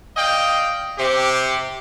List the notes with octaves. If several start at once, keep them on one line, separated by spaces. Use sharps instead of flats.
D5 D#5 F5 G5
C3 G4